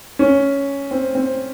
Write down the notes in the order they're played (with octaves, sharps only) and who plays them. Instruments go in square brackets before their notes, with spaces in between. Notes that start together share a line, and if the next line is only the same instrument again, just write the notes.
[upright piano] C#4
C4
C4